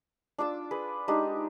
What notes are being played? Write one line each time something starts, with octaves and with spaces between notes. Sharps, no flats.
D4 F4 D6 E6
G#4 B4
G#3 D4 D#4 G4